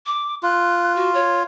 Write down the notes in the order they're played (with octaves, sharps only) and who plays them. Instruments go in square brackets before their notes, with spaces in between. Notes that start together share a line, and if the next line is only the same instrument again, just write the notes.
[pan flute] D6
[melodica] F4 [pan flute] F#6
[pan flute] F#4
C#5